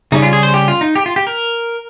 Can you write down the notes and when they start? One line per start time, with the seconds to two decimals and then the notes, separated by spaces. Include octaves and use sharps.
0.12 C#3 G3 C#4 D#4
0.22 F4
0.33 G#4
0.43 C5
0.54 G4
0.68 F4
0.81 D#4
0.95 G4
1.06 F4
1.16 G4
1.27 A#4